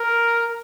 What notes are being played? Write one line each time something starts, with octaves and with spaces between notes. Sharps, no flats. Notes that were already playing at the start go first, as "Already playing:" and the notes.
Already playing: A#4